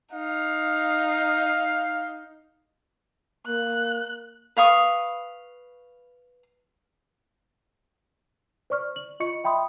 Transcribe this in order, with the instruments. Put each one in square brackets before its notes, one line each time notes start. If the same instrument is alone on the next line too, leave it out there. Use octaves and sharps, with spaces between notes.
[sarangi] D#4 [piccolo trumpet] F5
[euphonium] A#3 [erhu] F#6
[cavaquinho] B4 F5 C#6 D#6
[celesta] C5 D5 C#6 F6
F#7
F4 D#5 C#6 C#7
E5 G5 B5 C6 D#6